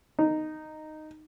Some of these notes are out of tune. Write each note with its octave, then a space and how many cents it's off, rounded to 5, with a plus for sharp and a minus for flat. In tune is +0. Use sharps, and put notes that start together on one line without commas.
D#4 -10